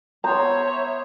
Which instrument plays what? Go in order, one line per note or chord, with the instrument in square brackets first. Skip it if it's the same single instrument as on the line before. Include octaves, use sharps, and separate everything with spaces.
[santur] B3 C5 [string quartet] C#5 E5 [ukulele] A#5